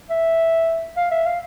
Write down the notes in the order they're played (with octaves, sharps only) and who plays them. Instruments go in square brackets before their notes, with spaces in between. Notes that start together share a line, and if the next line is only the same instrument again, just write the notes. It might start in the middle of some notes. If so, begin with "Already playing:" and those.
[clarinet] E5
F5
E5
F5